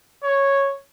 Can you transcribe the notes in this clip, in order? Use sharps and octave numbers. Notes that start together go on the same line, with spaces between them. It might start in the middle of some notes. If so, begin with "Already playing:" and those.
C#5